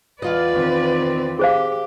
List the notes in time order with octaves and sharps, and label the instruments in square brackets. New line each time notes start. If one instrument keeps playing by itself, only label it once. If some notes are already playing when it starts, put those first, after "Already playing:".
[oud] E2 F4 D#5 [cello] B4 D5
[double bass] D#3 C4
[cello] G4 [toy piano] G#4 C5 F5